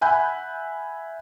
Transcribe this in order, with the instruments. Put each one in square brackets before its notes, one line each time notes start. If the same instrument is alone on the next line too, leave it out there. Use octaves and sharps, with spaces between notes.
[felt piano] E5 F#5 G#5 B5 F#6 G6